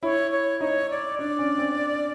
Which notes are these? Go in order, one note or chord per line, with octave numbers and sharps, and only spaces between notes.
E4 C#5
C#5
D#4 C#5
D5
D4 D5
C#4
C4